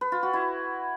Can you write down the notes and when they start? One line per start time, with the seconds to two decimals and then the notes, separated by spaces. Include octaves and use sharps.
0.01 B4
0.12 F4
0.23 F#4
0.34 E4